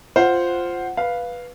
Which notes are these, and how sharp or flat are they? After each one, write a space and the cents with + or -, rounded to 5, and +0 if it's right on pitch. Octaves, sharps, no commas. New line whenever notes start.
F4 +0 C5 +0 F#5 +0
B4 -5 F5 +0